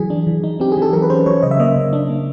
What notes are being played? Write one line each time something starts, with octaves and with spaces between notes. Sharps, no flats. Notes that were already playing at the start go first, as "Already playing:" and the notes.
Already playing: E3 F#3 G#4
D4
E3
D#4
C4 G4
G#4
E3
A4
F#3 A#4
B4
C#4 C5
F#3 C#5
C#3 D#5
E5
A#3 D#5
C#3
D4
A#3